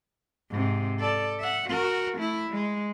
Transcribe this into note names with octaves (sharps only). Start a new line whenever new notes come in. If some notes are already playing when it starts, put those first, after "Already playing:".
G#2 C3
A4 D5
E5 F#5
F#4 A#4
A3 E4
G#3